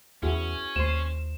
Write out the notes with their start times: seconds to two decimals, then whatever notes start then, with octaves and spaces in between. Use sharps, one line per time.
0.23 E2 C#4 E4 F#4 G#4
0.76 D#2 C5 C6 E7